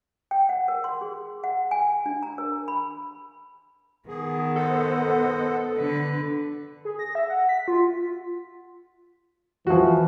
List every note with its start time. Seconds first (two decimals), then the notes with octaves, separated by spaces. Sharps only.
0.31 G5
0.49 F#5
0.68 A#4
0.84 C6
1.01 G#4
1.44 F#5
1.71 G#5
2.06 D4
2.23 A#5
2.38 A#4
2.68 B5
4.09 D#3 B3 G#4
4.56 A4 C5 D#5 F#5
5.77 D3 B4
6.85 G#4
6.99 A#6
7.15 E5
7.30 F#5
7.49 B6
7.68 F4
9.67 E3 F3 F#4